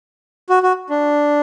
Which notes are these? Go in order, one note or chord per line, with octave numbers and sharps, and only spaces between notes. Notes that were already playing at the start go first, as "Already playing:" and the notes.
F#4
F#4
D4